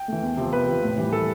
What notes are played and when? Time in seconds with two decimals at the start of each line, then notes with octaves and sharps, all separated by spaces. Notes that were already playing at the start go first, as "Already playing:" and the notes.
Already playing: G5
0.08 E3 A3
0.22 E2
0.37 C3 F3
0.52 E2 B4
0.67 C3 F3
0.83 A2
0.98 E3 G3
1.13 A2 A4